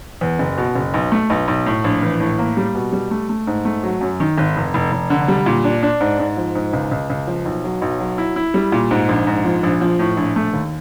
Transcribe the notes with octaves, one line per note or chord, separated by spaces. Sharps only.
E2
F#1
B2
F#1
B1
A3
B1
B1
A2
A#1
E3
A2
A#3
G3
B2
G3
A3
A3
G#2
A3
F#3
F#2
D#3
G#1
F1
F1
F1
D3
G3
A#2
D4
D4
G#2
G#2
F3
G#2
C#2
C#2
C#2
F3
B1
F#3
B1
F#3
E4
E4
G3
A#2
G#2
A#1
G#2
F3
A#1
F3
A2
A#1
A3
D#2